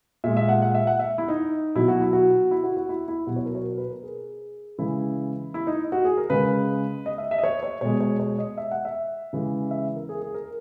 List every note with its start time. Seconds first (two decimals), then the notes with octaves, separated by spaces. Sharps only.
0.24 A#2 G#3 E5
0.37 E5
0.49 F#5
0.62 F#5
0.74 E5
0.87 F#5
0.99 E5
1.18 E4
1.28 D#4
1.75 B2 F#3 E4
1.88 F#4
2.01 E4
2.13 F#4
2.51 E4
2.64 F#4
2.77 F#4
2.89 E4
3.08 E4
3.27 B2 F#3 F#4
3.36 C#5
3.46 A#4
3.55 C#5
3.78 B4
3.90 A#4
4.03 G#4
4.78 C#3 E3 G#3 E4
5.54 E4
5.67 D#4
5.92 F#4
6.05 G#4
6.18 A#4
6.30 C#3 G#3 B4
7.06 D#5
7.18 E5
7.31 E5
7.38 D#5
7.44 C#5
7.63 C#5
7.81 B2 G#3 C#5
8.00 C#5
8.20 C#5
8.39 D#5
8.57 E5
8.71 F#5
8.85 E5
9.33 C#3 E3 G#3
9.71 E5
9.96 A#4
10.09 G#4
10.22 G#4
10.34 A#4